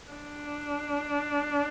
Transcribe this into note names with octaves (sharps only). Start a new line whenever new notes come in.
D4